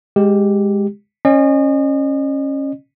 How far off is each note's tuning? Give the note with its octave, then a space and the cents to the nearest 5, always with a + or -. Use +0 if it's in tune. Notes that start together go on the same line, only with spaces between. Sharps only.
G#3 -10 G4 +0
C#4 -20 D#5 -40